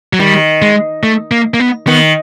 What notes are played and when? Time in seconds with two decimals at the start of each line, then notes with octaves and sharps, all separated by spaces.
0.13 F#3
0.20 D#3 G3
0.62 G#3
1.03 A3
1.31 A#3
1.54 A#3
1.60 B3
1.87 D#3 B3